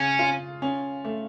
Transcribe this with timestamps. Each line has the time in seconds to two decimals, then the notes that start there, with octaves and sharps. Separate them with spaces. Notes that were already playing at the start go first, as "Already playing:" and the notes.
Already playing: C#3 C#4
0.19 F4
0.62 C#4
1.05 A3